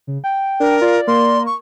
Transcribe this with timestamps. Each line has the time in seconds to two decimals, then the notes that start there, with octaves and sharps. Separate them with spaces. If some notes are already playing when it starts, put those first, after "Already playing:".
0.07 C#3
0.24 G5
0.60 D4 A#4
0.82 F4 D5
1.07 A#3 C6
1.46 C#6